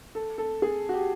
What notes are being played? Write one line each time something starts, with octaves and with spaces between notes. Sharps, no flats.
A4
A4
G#4
F#4
G4